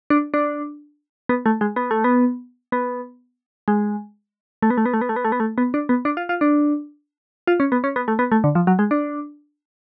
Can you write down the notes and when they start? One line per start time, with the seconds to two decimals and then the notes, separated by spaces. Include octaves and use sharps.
0.10 D4
0.34 D4
1.29 B3
1.46 A3
1.61 G#3
1.76 B3
1.91 A3
2.04 B3
2.72 B3
3.68 G#3
4.62 A3
4.70 B3
4.78 A3
4.86 B3
4.94 A3
5.01 B3
5.09 A3
5.16 B3
5.25 A3
5.32 B3
5.40 A3
5.58 B3
5.74 D4
5.89 B3
6.05 D4
6.17 F4
6.29 F4
6.41 D4
7.47 F4
7.60 C#4
7.72 B3
7.84 C#4
7.96 B3
8.08 A3
8.19 B3
8.32 A3
8.44 D3
8.55 F3
8.67 F#3
8.79 G#3
8.91 D4